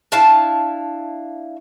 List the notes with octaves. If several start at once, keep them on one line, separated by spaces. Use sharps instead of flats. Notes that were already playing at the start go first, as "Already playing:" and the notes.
D4 E4 F5 A5